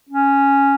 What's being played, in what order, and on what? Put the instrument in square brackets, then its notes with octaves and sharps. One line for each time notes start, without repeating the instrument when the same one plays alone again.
[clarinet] C#4